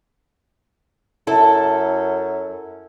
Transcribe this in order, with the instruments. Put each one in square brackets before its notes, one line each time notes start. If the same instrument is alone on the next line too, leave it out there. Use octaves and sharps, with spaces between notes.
[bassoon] F#2 [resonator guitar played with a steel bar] E4 A4